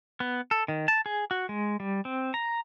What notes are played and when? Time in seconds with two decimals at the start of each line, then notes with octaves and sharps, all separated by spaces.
0.20 B3
0.51 A4
0.68 D#3
0.88 A5
1.06 G#4
1.31 F#4
1.49 G#3
1.80 G3
2.05 C4
2.34 A#5